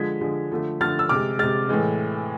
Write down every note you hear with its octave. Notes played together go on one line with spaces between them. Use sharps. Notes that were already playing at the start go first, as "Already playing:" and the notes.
Already playing: D3 F3 G#3 G#6 B6
D3 F3 G#3
D3 F3 A3
D3 F3 A3 F6 A6
E6
C3 G#3 D6 F6
C3 G#3 F6 A6
A2 E3 G#3